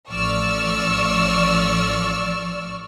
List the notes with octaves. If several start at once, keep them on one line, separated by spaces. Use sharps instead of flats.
A1 F3 D5 C#6 E6 F6